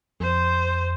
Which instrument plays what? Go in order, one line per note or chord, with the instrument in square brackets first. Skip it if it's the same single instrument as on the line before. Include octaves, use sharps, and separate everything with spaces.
[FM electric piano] F2 [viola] C5